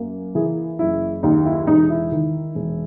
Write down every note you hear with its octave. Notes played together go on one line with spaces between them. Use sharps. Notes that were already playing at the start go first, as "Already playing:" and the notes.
Already playing: F#2 A#3
E3 G#4
F#1 E4
D#2 D#4
E4
E1 D#4
E4
D#3
E1